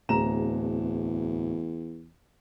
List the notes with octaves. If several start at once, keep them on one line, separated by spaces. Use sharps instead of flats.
D1 E2 A#5 E7